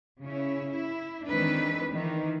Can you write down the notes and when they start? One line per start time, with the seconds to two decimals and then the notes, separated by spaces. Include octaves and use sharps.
0.22 C#3 C#4 E4
0.71 E4
1.28 D#3 E3 G#3 C4 D4 B4
1.93 D#3 E3